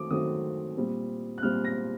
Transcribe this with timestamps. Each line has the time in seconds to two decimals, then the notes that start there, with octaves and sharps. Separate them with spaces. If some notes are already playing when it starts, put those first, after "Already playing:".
Already playing: D#3 F#3 A3 C4 D6 D#6
0.10 D#3 F#3 A3 C4 D#6
0.77 A#2 G3 C4
1.38 F#6
1.43 A#2 G3 C4 F6
1.64 A#6